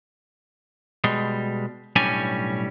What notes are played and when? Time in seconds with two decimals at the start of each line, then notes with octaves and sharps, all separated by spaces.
1.04 B2 G3 G#3
1.96 B1 A2 G3 C#4 D4 G#5